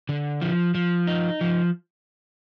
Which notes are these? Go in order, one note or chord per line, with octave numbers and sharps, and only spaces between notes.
D3
F3
F3
D#4
F3